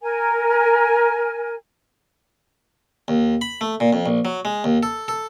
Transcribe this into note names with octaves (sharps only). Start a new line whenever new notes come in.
A#4 G#5
D#2
B5
A3
A#2
F2
A#1
F#3
G#3
D#2
A4
A4